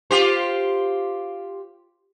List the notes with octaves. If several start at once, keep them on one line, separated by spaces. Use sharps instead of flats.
F4 G4 C5